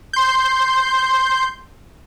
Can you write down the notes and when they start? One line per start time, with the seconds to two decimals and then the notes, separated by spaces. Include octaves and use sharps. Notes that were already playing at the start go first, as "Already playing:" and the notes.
0.13 C6 G6